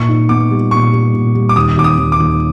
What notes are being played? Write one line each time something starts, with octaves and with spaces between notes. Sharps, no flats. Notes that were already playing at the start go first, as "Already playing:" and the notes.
Already playing: A#2 C#6
D#4
B3 D6
G3
A#2 C#6
G3
A#2
G3
D6
D#2 D#6
D#2 D6
D#6
D#2
D6
D#2